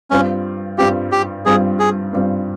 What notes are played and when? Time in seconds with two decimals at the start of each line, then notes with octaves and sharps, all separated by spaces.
0.11 G2 G3 C4 C#4 F4
0.78 G2 G3 C4 F4 G4
1.12 G4
1.46 G2 G3 C4 F4 G#4
1.79 G#4
2.13 G2 G3 C4 F4